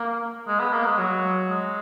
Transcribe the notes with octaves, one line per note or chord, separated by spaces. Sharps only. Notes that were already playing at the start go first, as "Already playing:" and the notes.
Already playing: A#3
G#3
B3
A#3
G#3
F#3
G#3